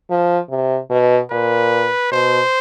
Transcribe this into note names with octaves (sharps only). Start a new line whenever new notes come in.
F3
C3
B2
A#2 B4
B2 C5